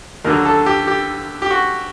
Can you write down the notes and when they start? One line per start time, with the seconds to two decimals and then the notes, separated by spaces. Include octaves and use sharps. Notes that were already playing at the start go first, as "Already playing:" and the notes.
0.24 D#2 D3 F#3 A#4
0.45 A4
0.66 G4
0.87 G4
1.42 G4
1.51 F#4